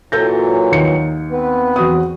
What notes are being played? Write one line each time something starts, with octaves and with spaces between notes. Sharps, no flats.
A#2 E3 F#3 A4 G6 A#6
D#2 D#4 C#7
B3 C4 B4
E2 F#4 D#6